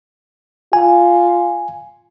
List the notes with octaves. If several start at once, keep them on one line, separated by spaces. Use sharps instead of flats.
F4 G#5